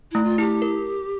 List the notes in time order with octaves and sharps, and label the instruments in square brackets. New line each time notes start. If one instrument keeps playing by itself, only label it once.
[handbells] A3 [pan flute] E4
[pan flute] F4
[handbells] E4 [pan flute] G4
[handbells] A#4